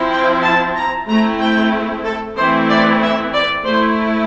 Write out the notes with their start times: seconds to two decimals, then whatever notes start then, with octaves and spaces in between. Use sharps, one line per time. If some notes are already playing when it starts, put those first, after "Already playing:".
Already playing: F3 C4 E4
0.11 G5
0.43 A5
0.75 A#5
1.08 A3 C4 E4 A#5
1.40 G5
2.04 A4
2.36 E3 A3 C4 E4 C5
2.69 D5
3.01 E5
3.33 D5
3.65 A3 E4 C5